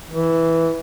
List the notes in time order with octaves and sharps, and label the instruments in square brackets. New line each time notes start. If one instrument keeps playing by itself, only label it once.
[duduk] E3